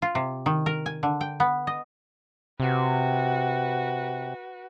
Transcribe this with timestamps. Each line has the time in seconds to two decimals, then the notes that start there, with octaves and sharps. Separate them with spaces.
0.02 F4
0.15 C3
0.46 D#3
0.66 A#4
0.86 G#5
1.03 D3
1.21 G5
1.40 B3
1.67 D#5
2.60 C3 F#4 B4